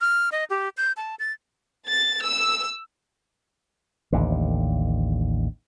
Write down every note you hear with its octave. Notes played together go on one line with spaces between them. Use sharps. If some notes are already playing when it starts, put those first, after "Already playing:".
F6
D#5
G4
G6
A5
A6
A6
E6
A1 D#2 D3